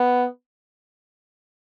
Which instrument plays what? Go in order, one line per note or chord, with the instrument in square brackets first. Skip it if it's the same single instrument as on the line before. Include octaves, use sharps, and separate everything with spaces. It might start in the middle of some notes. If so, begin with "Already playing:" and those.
Already playing: [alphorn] B3